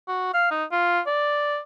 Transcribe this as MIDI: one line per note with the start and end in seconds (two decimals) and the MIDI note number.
0.08 0.29 66
0.34 0.48 77
0.51 0.64 63
0.72 1.00 65
1.07 1.58 74